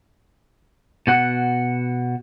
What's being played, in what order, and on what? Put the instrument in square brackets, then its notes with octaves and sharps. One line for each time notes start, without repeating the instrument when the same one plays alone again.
[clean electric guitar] B2 F#4 F#5